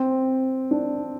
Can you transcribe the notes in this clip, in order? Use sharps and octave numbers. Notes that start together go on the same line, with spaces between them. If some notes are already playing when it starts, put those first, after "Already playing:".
Already playing: C4
D4